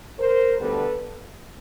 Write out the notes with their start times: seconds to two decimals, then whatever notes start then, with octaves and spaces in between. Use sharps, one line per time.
0.20 A#4 C5
0.59 D2 D3 G3 B3 D4 A4 B4